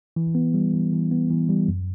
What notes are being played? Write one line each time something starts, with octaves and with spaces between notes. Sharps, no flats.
E3
B3
G3
E3
E3
B3
E3
G3
F#2